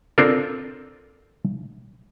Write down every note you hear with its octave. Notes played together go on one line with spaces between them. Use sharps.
C4 D4 F4 A4 A#4